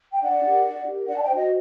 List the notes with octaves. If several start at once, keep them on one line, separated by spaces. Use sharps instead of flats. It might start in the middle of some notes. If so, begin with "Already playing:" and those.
G5
D4 D5 F#5
G4 A#4
D4
G4 A#4
D4 D5 F#5
A5
D#5 G5
C5
F#4 D#5